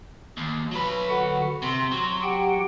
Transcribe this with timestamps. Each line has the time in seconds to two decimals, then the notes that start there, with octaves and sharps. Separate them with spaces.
0.37 D#2
0.71 F#3 B4
1.10 D3 F#4 F#5
1.62 C3 C6
1.92 F#3
2.22 G4 F#5 G5